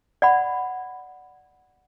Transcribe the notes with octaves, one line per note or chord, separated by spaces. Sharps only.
D5 F#5 B5